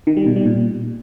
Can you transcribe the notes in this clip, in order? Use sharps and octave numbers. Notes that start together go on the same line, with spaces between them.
D#3
G3
B2
G3
A#2